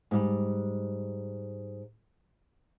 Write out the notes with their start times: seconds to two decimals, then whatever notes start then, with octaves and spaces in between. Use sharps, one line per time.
0.11 G#2 G3